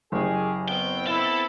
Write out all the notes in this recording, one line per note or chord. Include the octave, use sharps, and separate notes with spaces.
F#1 G4 G#4
B3 C4 G5
E4 A4